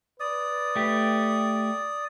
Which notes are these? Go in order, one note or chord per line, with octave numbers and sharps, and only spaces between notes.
B4 D5 D#6
A3 G4